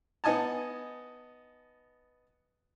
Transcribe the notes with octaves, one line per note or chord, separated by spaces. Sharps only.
B3 D#4 D#5 G#5 A5